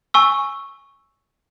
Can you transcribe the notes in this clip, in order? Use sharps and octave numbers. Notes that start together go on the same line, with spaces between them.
G#5 C#6 E6